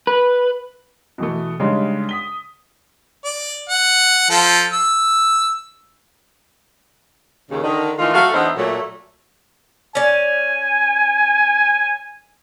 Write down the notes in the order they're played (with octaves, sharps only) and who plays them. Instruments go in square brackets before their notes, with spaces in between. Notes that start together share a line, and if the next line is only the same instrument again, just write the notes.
[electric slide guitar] B4
[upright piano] B2 E3 A3
C#3 G3 G#3 D4 D#4
D#6 B6 G7
[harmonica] D5
F#5
F3 A4
E6
[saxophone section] D#2 C#3
D3 D#3
D#3 E3 A3 D#4 F4
F#3 A3 F#4 A4 F5
E2 B3 D4 D#4 C5 E5
A#2 F#3 A3
[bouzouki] C#4 D5 [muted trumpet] G#5